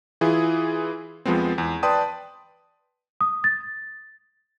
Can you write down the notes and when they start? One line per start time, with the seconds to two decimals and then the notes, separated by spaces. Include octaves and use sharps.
0.21 E3 E4 F4 G#4
1.25 F2 F3 G#3 B3 C4
1.58 E2
1.83 B4 D5 G5 A5 C6 D#6
3.21 D#6
3.44 A6